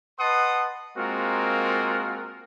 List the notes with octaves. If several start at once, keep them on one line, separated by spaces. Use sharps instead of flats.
B4 D#5 F#5 A5 C6 D#6
G#3 A#3 C4 F4 F#4 A#4